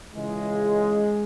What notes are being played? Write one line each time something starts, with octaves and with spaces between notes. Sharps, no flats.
C#2 C#3 E3 G#3